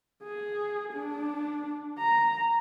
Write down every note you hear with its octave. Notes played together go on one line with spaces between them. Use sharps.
G#4
D4
A#5